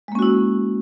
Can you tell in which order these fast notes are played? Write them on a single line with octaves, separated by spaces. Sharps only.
G#3 A#3 C#4 F#4 E4